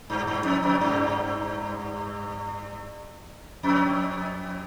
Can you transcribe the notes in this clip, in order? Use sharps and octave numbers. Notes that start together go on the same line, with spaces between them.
G2
G2
F2
F2
G2
F2